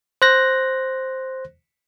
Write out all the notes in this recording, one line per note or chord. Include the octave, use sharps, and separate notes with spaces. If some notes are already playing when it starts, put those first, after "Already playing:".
C5 F#6 A#6